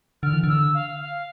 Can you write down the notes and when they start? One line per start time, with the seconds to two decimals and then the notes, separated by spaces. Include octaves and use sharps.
0.23 D3 F6
0.33 E3
0.44 D3
0.49 E6
0.74 F5
1.00 F5